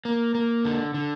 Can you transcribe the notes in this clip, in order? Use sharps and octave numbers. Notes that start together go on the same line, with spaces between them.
A#3
A#3
D3
D3